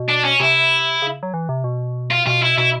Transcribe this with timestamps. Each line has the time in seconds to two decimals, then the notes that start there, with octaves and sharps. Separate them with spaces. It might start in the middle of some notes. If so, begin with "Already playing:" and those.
Already playing: B2
0.09 D4
0.24 C#4
0.40 C3 E4
1.02 C#3
1.23 F#3
1.34 E3
1.49 C3
1.64 B2
2.11 F4
2.27 B2 F4
2.43 E4
2.58 B2 E4